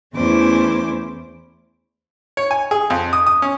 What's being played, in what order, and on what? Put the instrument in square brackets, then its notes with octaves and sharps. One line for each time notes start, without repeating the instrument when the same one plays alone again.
[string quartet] E2 A3 C#4 E4 C5 D6
[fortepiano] C#5
G#5
G#4
F2
D#6
D#6
C#4